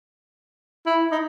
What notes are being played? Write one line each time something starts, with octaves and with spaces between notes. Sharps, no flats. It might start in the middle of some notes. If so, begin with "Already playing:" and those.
E4
D#4